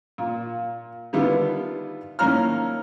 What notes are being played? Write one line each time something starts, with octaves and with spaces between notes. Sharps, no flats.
A#2
D3 D#3 G3 B3 E4 F4
A2 D#3 A#3 C#4 A#5 F6